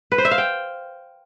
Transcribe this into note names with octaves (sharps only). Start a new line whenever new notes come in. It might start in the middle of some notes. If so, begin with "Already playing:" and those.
B4
C5
E5
F5
G5